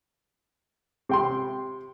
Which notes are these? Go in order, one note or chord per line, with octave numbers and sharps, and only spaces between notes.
C3 G5 C6